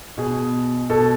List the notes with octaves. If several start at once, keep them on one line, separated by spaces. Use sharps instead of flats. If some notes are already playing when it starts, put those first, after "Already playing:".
B2 G#4
B2 A4